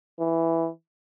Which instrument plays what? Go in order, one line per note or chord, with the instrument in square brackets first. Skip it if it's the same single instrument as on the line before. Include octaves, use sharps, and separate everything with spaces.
[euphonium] E3